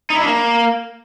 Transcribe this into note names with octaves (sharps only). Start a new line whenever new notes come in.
D#4
E4
D4
A#3